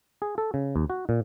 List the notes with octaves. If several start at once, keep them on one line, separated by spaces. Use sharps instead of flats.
G#4
A4
C#3
D#2
F#4
A#2